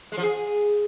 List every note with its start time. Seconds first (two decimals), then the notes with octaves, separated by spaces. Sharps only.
0.12 G#3
0.17 F3
0.23 G#4